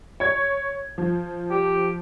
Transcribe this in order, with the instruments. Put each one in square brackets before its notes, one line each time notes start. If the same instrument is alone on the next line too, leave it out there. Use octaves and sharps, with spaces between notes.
[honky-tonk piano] C#5 G#6
F3
[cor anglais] G4